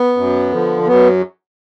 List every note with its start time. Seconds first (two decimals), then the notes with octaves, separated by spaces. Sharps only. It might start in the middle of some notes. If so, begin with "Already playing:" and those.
Already playing: B3
0.17 F#2
0.52 D3 F3
0.87 F#2 B3